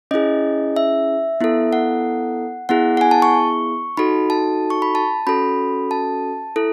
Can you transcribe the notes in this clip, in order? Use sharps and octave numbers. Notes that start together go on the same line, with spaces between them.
C#4 E4 G#4 D#5
E5
B3 E4 A4
F#5
B3 E4 G#4 F#5
F#5
G#5
A5
C#6
D#4 F#4 A4 B5
A5
C#6
B5
A5
C#4 F#4 A4 B5
A5
E4 A4